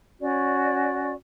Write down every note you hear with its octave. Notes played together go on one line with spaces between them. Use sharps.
C#4 F#4 D5